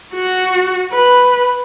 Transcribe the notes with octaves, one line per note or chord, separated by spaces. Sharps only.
F#4
B4